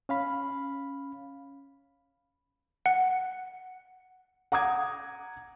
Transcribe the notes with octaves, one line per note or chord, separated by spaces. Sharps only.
C#4 F5 B5
F#5
F#5 A#5 D6 D#6 G#6